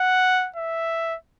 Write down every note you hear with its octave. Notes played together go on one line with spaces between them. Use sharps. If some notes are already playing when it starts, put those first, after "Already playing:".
Already playing: F#5
E5